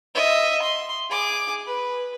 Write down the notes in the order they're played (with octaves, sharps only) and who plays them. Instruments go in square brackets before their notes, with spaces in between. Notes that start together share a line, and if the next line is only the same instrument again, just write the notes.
[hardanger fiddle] D#5 E5
C6
G#4 D6
B4